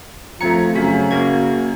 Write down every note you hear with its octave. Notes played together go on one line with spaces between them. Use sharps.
F3 A3 C4 A#5 G#6 C#7
F#2 C#3 B6
A#3 F#4 G#6